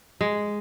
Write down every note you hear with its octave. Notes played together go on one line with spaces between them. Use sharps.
G#3